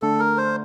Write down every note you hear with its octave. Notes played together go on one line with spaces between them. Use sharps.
D3 A3 D4 A4
A#4
C5